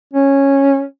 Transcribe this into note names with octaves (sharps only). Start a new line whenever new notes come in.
C#4